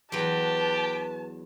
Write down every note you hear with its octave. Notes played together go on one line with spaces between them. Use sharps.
E2 F#3 G4 B4 A5